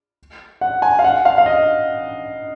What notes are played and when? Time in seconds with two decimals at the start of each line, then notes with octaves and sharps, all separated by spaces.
0.61 F#5
0.82 G#5
0.99 F5
1.04 F#5
1.25 F5
1.38 F5
1.46 D#5